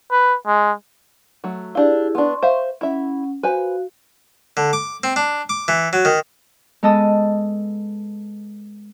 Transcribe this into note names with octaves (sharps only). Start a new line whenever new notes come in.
B4
G#3
F#3 A3
D4 E4 G4 G#4 F5
B3 D4 C6 C#6
C5 E5 F5
C#4 E4 E5 F#5
F#4 B4 C5 F5 G#5
D3
D6
C4
D4
D6
E3
F#3
D#3
G#3 B3 A4 D#5 A5 D#6